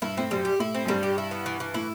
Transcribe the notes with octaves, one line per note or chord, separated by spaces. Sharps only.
G2 E4
A2 C4
F#2 G3
G4
A2 E4
C4
F#2
G2 G3
G4
E4
B3
E3
E3
A2 E4